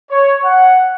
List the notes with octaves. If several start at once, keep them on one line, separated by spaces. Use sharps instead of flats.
C#5
F#5